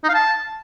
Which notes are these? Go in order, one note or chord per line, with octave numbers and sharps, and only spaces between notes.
D#4
F5
A5